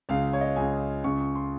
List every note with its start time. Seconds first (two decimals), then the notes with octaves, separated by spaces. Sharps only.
0.09 C#2 C#3 F5
0.33 C#5
0.41 D#5
0.56 C#2 C#3 G#5
1.04 C#2 C#3 C#6
1.20 C#6
1.35 C6